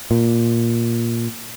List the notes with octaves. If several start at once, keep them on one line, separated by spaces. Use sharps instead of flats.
A#2